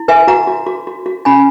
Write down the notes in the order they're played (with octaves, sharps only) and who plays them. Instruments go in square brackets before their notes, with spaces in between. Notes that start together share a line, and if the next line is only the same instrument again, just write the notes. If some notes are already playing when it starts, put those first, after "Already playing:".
Already playing: [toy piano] E4
B4 E5 G#5
F#4 F#5 A#5
F#4
F#4
F#4
F#4
C#4 G#5 B5